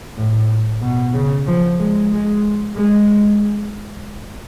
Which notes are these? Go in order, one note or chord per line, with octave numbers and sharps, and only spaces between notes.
A2
B2
C#3
F3
G#3
G#3
G#3